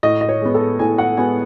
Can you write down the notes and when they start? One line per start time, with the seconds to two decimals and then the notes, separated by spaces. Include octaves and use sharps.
0.03 A2 D#5
0.21 D#5
0.29 C#5
0.42 G#3 B3
0.54 A4
0.79 A2 G#5
0.98 F#5
1.17 G#3 B3 G#5